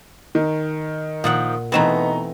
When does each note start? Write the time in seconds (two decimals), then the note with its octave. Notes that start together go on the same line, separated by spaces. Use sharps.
0.35 D#3
1.24 A#2 D#3 F3 F#5
1.72 B2 E3 A3 B3 C4 D#4 A#5